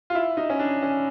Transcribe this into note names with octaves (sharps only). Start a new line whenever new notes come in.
F4
E4
D#4
C#4
D4
C#4